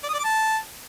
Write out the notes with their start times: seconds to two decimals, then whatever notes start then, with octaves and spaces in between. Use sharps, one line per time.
0.04 D5
0.09 D#6
0.14 D5
0.19 D6
0.24 A5